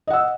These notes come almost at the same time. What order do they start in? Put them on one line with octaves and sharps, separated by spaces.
D#5 F#5 E6